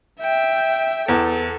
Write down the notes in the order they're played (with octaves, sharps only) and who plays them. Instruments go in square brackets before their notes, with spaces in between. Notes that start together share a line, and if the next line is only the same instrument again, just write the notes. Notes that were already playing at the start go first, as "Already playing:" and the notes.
[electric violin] E5 G5
[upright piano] E2 [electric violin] A4